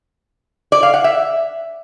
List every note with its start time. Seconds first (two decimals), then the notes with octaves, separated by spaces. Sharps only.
0.72 D5
0.83 F5
0.94 F#5
1.04 E5